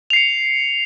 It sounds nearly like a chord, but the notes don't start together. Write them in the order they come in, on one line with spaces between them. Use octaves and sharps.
F7 C7 C#7